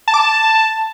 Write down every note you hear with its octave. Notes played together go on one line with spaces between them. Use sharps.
A5
D6
A5